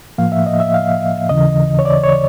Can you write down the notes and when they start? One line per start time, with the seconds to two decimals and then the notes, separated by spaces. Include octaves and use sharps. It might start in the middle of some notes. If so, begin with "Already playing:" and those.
0.18 A2 F3 A#3 F5
0.32 E5
0.46 D#5
0.60 E5
0.74 F5
1.29 D#2 C#3 E3 D#5
1.79 C#5
1.85 D5
2.04 C#5